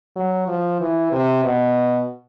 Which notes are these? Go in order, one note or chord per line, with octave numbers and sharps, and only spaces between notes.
F#3
F3
E3
C3
B2